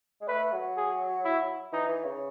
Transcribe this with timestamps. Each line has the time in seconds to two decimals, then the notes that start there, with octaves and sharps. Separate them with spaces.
0.22 G#3
0.28 A3 B4
0.52 F#3
0.77 G#4
1.25 E4
1.73 E3 D#4
1.89 E3
2.05 C#3